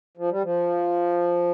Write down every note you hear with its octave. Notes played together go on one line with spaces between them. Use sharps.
F3
G3
F3